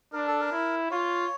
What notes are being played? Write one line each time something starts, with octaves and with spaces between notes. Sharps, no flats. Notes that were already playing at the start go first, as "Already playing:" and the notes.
D4 A#4
A4
A#4
E4
F4 C#5